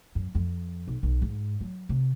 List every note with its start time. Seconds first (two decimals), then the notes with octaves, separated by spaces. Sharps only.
0.15 F#2
0.35 F2
0.88 B1
1.03 B1
1.22 G#2
1.61 F#3
1.89 C3